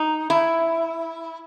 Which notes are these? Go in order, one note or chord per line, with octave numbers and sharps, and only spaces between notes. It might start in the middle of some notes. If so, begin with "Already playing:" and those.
Already playing: D#4
E4